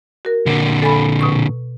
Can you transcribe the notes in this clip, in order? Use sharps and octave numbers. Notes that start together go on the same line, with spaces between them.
F#4 A#4
A#2 D3
A4 G#5 B5
B2 C#6